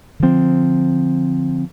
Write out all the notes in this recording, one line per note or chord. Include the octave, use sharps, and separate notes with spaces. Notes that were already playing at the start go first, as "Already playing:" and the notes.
D3 F3 C4